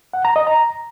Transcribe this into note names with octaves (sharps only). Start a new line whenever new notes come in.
F#5
A#5
D#5
A#5